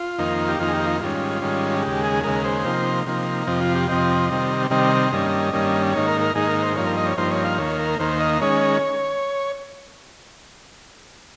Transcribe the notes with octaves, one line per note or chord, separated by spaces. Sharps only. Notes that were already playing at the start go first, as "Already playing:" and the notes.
Already playing: F4
F2 D#3 A#3 D#4
G4
F2 D#3 A#3 D#4 F4
G#4
G4
F4
G#2 D#3 G3 C#4 F4
G#2 D#3 G3 C#4
D#2 C#3 G#3 G4
G#4
D#2 C#3 G#3 A#4
C5
C3 F3 A#3 D#4
C3 F3 A#3 D#4
F2 C3 F3 C4 D#5
F4
G4
F2 C3 F3 C4 D#5
C3 D#3 G3 C4
C3 D#3 G3 C4 D#5
G2 D#3 G3 A#3 C#4
G2 D#3 G3 A#3 C#4
G#2 D#3 A#3 D#4 C#5
A#4
A#4
G#2 D#3 A#3 D#4 G#4
A#4
C5
G2 F3 A#3 D#4 C#5
A#4
D#5
C#5
G2 F3 A#3 D#4 C5
C#5
F5
D#2 D#3 A#3 C#5
A#4
D#2 D#3 A#3 C5
D#5
D#3 G#3 C#4 C#5